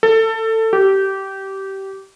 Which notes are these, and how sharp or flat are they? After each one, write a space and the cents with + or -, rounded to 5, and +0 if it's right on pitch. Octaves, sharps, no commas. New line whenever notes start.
A4 +20
G4 -20